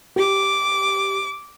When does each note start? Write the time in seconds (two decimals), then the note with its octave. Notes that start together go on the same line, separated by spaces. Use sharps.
0.16 G4 D6